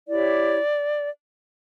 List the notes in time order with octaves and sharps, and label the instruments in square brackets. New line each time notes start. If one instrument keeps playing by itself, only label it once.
[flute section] E4 G4 C#5 D5